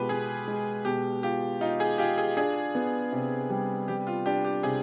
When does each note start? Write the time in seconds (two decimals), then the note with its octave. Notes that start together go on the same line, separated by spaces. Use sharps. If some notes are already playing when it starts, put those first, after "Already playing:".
Already playing: B2 G#3 F4 G4 B4
0.09 B3 G#4
0.48 G#3
0.85 B2 G4
1.23 F4 G4
1.61 D#4 F4
1.80 G#4
1.98 F4 G4
2.18 G#4
2.37 D4 G#4
2.75 B3
3.13 C3
3.50 G3
3.88 G3 G4
4.07 F4
4.26 D4 G4
4.44 G4
4.63 C3 G#4